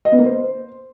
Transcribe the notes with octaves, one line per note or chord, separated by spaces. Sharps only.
D#5
B3
A#3
C5